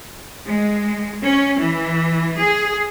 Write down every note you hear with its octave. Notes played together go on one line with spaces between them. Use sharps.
G#3
C#4
E3
G#4